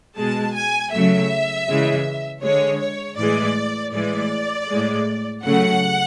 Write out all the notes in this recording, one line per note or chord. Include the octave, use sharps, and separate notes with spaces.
B2 G#3 A5
G#5
C#3 F#3 A3 E5
C#3 E3 G#3
D3 G#3 C#5
C#5
A2 E3 G#3 D5
A2 E3 G#3 D5
A2 G#3
C#3 F#3 A3 F#5